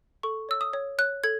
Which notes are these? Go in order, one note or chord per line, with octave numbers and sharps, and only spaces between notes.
A4 C#6
C#5 E6
D#6
C#5
C#5 F#6
A4 G#6